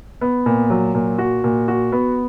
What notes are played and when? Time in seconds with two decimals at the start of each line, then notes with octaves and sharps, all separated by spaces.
0.21 B3
0.46 A#2
0.70 F#3
0.95 A#2
1.18 F#4
1.44 A#2
1.68 F#4
1.92 B3